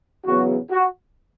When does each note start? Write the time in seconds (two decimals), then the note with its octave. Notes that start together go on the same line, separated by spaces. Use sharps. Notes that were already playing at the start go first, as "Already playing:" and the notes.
0.25 E2 C#3 F#3 B3 F#4
0.71 F#4